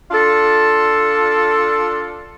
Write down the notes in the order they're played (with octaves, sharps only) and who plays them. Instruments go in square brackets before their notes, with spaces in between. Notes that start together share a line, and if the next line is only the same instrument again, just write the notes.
[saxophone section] D4 F4 A4